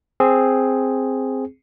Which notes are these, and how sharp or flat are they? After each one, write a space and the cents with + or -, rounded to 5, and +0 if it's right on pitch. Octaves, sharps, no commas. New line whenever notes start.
C4 +0 G#4 +0